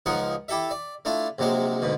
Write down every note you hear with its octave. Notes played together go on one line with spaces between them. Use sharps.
C#2 F3 D#4 G#4 F#5
E4 G4 A4 E5
D5
A3 D4 E4 F4
A#1 C3 F#3 G#3 C5
D2 G#2 B2